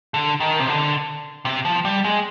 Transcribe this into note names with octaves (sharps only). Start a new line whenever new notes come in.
D3
D#3
C3
D3
C3
F3
G3
G#3